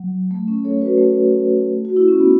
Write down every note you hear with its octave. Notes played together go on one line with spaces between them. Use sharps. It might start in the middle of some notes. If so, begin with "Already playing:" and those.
Already playing: F#3
A3
C#4
A4 C#5
F#4 B4
A3
F#4
E4
C#4
B3